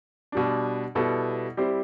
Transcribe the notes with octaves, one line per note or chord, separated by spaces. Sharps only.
B2 G3 D4
B2 G3 B3 E4 A4
G3 C4 E4 G4 C5